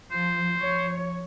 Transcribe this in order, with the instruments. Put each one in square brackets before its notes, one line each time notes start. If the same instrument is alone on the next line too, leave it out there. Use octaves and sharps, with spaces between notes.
[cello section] F3 [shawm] C5
[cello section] F3 C#5